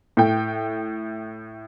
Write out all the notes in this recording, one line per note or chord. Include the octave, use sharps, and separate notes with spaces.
A2 G5